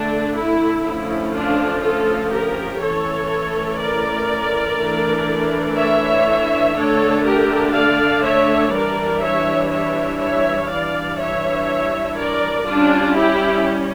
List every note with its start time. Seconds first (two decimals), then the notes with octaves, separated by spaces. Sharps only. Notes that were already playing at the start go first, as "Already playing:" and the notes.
Already playing: D3 A3 D4
0.34 E4
0.84 D3 F3 A3 C#4 E4
1.33 D4 F4
1.82 F4 A4
2.31 G4 A#4
2.80 E3 A3 C#4 A4 C#5
3.79 A#4 D5
4.78 E3 A3 D4
5.76 C#5 E5
6.75 D3 A3 D4 A4 C#5
7.24 G4 A#4
7.73 D5 F5
8.23 C#5 E5
8.72 E3 G3 D4 A#4 D5
9.21 C#5 E5
9.70 C#5 E5
10.19 C#5 E5
10.69 E3 G3 D4 D5 F5
11.18 C#5 E5
12.17 A#4 D5
12.66 G3 C#4 D4 F4
13.15 E4 G4